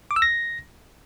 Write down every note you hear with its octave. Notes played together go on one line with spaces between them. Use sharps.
D6
E6
A#6